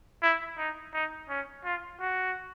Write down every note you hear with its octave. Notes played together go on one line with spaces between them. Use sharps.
E4
D#4
D#4
C#4
F4
F#4